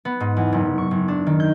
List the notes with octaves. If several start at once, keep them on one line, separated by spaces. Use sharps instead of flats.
B3
G#2
E2
F#1
C3
C#6
F#1
D4
D#3
G6